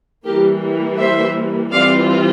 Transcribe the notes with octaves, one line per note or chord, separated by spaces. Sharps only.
E3 G3 A#3 G4 A#4
C5 E5
E3 G3 C4 F4 D5 F5